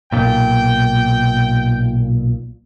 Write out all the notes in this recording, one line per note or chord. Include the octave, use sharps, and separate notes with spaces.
B1 A#2 G5